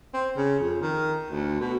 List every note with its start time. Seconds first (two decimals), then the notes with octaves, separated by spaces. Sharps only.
0.14 C4
0.36 C#3
0.60 F2
0.81 D#3
1.30 D2
1.60 B2